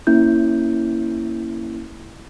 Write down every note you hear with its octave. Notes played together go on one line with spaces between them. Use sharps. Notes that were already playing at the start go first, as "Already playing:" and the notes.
A#3 C#4 E4 G6